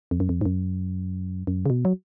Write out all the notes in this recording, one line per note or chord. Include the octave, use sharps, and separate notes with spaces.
F2
F#2
F2
G#2
F#2
F#2
C#3
B2
F#3